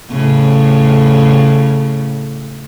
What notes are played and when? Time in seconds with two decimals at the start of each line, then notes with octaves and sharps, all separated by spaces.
0.10 A2 C#3